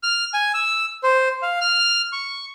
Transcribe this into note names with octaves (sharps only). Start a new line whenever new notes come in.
F6
G#5
E6
C5
F5
F6
C#6